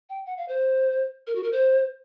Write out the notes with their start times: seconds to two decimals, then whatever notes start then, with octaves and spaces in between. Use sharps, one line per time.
0.09 G5
0.26 F#5
0.38 F5
0.48 C5
1.27 A#4
1.35 F#4
1.43 A#4
1.52 C5